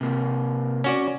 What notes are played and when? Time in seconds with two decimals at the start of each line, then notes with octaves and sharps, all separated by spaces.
0.01 C3 A#3
0.84 C#4 F#4 D5